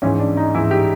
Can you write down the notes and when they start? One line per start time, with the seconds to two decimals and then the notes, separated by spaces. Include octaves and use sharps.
0.02 G#2 E3 C#4
0.19 D4
0.37 D#4
0.54 G#2 E3 E4
0.71 G4